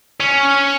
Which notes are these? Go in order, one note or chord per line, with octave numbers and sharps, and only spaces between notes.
C#4